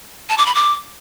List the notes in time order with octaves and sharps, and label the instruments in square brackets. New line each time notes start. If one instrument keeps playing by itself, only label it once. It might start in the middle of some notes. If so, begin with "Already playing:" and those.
[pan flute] A5
D6
B5
D6